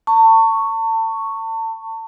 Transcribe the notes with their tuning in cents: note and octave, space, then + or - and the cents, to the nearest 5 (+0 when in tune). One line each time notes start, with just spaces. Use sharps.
A5 +35 C#6 +0